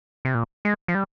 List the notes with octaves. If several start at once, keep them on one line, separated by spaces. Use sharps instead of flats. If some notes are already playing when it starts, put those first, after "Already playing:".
C3
A#2
G#3
F3
G3